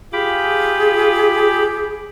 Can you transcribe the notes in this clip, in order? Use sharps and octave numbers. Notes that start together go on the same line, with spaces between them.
F4 G4 G#4 B5 D6